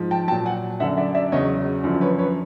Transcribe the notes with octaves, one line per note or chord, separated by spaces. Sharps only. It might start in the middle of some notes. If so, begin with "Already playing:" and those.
Already playing: G#2 F3
G5 A5
A#2 F#3 G5 A5
F#5 G#5
F#2 D3 F#3 E5 F#5
D5 E5
D5 E5
E2 C#3 F#3 C#5 D#5
F#2 D3 F3
B4 C#5
B4 C#5